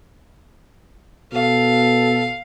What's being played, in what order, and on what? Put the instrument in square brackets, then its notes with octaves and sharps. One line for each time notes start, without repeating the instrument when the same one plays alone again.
[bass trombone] B2 [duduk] A4 [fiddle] F5